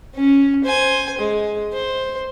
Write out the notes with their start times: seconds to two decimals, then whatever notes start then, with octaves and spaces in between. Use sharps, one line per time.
0.16 C#4
0.64 C5 G#5
1.18 G#3
1.73 C5